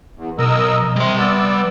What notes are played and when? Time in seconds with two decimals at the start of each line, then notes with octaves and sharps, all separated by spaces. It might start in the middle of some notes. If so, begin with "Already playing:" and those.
0.16 E2
0.39 B1 A#4 D#5 E6
0.96 C3 G3 C6
1.18 B3 D5 E6